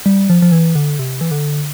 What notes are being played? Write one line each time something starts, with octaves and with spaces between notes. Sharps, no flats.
G3
F3
F3
E3
D3
C3
E3
D3